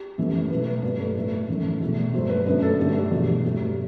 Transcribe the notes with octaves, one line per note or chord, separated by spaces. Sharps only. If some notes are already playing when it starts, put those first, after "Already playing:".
Already playing: G4
F#2 E3 A3
B2 F#3 A3 B4
G2 F#3 A3 B4
A4
A2 F#3 A3 B4
F#2 E3 A3
E2 B2 A3
G2 F#3 A3 C5
B4
F#2 D3 F#3 A3 B4
A4
G2 D3 A3 G4
F#4
G4
E2 B2 F#3 A3
G2 F#3 A3 G4
F#4